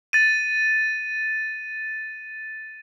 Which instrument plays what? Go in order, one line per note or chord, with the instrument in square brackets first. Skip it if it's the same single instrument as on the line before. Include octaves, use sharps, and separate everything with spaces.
[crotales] A6 D#7